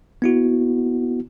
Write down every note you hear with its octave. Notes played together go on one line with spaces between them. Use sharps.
B3 E4 F#4